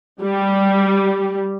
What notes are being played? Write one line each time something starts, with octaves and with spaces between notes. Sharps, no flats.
G3